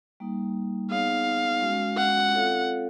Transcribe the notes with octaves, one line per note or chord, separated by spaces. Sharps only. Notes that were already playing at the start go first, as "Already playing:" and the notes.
G3 A#3 D#4
B3 D#4 G#4 C#5 F5 F#5
G#3 C#4 F#4
F#5
C4 F4 A4 C#5 F5